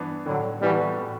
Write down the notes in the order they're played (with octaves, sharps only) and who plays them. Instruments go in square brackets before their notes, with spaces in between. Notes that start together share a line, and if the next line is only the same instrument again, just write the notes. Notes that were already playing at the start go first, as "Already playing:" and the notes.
Already playing: [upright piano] G2 E3 B3 D4
[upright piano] A2 [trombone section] D3 F#3
[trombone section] E3 G3 [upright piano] F#3 B3 F#4 A4
[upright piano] A2